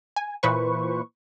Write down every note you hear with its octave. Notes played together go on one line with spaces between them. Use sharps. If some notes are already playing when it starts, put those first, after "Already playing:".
G#5
A#2 E3 B4 C5 C#6